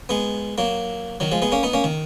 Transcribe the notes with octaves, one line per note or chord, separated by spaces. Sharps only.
G#3 B3
F#3 A#3
D#3 F#3
F3 G#3
G#3 B3
A#3 C#4
B3 D#4
A#3 C#4
D#3